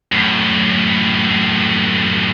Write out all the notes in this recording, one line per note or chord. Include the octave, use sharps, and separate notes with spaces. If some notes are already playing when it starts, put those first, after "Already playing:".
F#2 A2